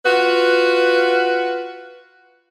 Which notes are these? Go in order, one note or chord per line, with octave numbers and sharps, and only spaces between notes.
F4 F#4 B4